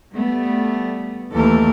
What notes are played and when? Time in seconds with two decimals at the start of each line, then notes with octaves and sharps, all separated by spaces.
0.14 G3 A3 B3
1.32 D#2 E3 A3 A4 A#4